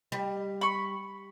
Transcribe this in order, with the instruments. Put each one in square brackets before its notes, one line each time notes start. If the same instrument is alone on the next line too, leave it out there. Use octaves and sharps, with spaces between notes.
[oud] G3
[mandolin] B5 C#6